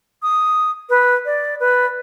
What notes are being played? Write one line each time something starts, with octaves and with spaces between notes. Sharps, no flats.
D#6
B4
D5
B4